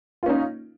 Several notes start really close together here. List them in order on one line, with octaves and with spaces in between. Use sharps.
F4 C#4 D#4